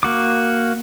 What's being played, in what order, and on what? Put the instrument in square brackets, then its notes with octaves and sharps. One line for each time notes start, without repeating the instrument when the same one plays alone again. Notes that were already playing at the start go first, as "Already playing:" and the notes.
[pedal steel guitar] A#3 F#4 D6